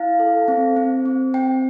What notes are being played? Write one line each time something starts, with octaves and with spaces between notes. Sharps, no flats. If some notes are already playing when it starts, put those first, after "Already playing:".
Already playing: E4 F5
A4
C4
C4
C4
C4 G5